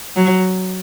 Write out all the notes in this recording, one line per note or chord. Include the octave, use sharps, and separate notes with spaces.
F#3